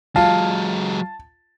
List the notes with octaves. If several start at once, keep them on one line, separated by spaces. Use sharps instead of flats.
F#3 G#3 F4 A5